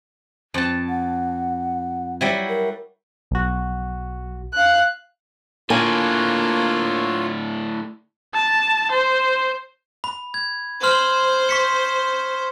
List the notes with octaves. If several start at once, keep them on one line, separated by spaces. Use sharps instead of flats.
F2 A5
F#5
F#3 G3 E4
A#4
B1 F#4
F5 F#6
A2 D3 A#3 F4 C#5 G#5
A5
C5
B5
G#6
C5 C6 F6 F#7
C#6 B6 C#7